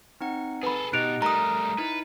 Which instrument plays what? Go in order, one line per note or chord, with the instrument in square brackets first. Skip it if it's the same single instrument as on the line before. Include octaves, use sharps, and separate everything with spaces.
[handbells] C4 D#4 F#5
[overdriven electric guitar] G#4 A4 [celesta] B4 B5
[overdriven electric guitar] B2 [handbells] D#4 G4 D#5 [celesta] F#6 D7 F7
[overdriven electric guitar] G3 A3 [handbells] A#4 [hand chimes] A#5 D#6
[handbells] D#4 E4 [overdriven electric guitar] B4